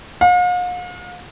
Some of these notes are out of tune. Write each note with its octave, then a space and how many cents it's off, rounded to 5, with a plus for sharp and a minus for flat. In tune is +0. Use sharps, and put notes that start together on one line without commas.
F5 +45